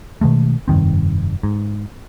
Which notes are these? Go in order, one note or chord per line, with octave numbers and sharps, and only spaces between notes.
B2 D#3 G#3 A3
F1 G2 D#3 C4
G#2